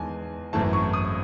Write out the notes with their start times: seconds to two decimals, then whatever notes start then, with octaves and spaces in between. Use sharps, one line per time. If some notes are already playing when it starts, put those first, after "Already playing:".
Already playing: E2 D#3 G#3 G#5 A5
0.53 G#1 F#2 E3 A3 A5
0.73 C#6
0.93 D#6